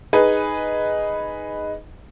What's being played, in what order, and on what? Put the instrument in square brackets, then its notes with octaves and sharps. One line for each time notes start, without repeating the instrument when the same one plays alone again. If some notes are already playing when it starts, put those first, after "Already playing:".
[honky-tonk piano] D#4 G#4 B4